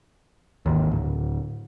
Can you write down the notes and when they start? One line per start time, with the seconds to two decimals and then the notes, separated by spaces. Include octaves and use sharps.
0.66 G#1 D#2
0.92 D1